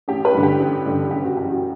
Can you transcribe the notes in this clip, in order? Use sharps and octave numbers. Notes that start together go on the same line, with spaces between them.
A1 G4
B4
G2 D3
G4
A1
G2 D3
F#1 G4
F#4
F#2 C#3 E3 G4
F#4